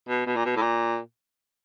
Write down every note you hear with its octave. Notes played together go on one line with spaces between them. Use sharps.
B2
B2
A#2
B2
A2
A#2